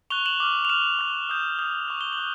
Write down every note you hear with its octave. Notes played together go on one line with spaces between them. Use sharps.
C#6 F#6 F7 G7
E7 F#7
D6 F6
F7
D6 F6 E7 F#7
C#6 F#6
D#6 G6
D#6 G6
C#6 F#6
G7
F#7
D6 F#6